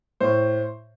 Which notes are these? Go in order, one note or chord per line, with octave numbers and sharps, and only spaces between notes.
A2 C5